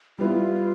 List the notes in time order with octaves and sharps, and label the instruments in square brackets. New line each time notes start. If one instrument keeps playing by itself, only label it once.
[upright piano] G3 B3 E4 [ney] F4